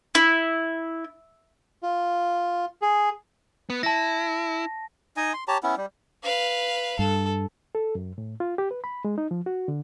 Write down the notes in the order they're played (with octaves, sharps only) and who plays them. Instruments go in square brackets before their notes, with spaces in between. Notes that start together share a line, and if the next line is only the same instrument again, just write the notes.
[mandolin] E4
[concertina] F4
G#4
[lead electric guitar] B3
[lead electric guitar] E4 [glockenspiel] A5 A#6
[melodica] D#4 D#5 G#5
C6
G4 C#5 A5 A#5
B3 C#4 E4
G3
[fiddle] B4 F5
[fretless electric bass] G2 [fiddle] A4
[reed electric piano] A4
F#2
A2
F4
G4
B4
B5
G#3
D#4
F3
F#4
D3